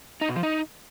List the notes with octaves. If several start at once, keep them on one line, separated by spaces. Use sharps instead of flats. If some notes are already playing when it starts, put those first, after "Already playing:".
D#4
B2
F3
D#4